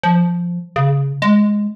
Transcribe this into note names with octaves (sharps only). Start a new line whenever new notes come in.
F3
C#3
G#3